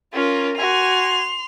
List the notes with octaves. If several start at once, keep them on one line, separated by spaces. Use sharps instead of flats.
C#4 F4 A#4
F#4 G#5 C6 F7